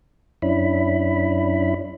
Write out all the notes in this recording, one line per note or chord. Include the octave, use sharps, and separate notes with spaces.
F#2 C#4 D4 E4 B5